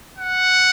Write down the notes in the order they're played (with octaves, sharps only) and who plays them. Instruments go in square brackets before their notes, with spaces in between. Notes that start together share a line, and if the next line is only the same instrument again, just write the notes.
[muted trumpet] F#5